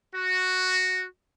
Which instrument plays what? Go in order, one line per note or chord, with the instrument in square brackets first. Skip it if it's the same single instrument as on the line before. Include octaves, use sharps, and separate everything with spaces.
[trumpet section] F#4